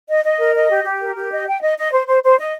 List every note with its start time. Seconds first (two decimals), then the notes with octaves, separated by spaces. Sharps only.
0.08 D#5
0.24 D#5
0.39 A#4
0.54 D#5
0.70 G4
0.85 G4
1.00 A#4
1.15 G4
1.31 D#5
1.46 G5
1.62 D#5
1.77 D#5
1.92 C5
2.07 C5
2.23 C5
2.38 D#5